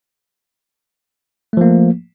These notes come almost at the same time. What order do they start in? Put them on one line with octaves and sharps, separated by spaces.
A3 F3 A#3